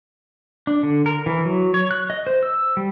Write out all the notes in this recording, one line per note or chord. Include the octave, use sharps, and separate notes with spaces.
D4
D3
A#4
E3
F#3
C#5
F#6
D#5
C5
E6
G3